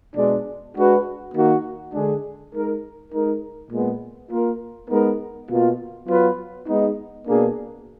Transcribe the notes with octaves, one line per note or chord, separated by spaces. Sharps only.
B2 G#3 D4
G#3 D4 F#4 B4
D#3 A#3 D#4 F#4
D3 G#3 D4 G#4
G#3 D#4 A#4
G#3 D#4 A#4
A#2 G#3 B3
A#3 F4 A#4
G#3 B3 D#4 A#4
B2 A#3 F4
F#3 B3 F4 B4
G#3 B3 D#4
B2 A#3 D4 G#4